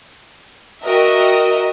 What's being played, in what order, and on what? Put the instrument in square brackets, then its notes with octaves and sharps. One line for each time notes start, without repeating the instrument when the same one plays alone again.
[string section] F#4 A#4 D#5 E5 G5